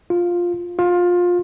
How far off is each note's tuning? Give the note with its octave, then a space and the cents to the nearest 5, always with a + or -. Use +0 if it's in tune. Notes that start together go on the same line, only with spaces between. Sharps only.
F4 +5
F4 +20